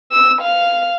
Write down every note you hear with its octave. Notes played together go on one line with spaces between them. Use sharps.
E6
F5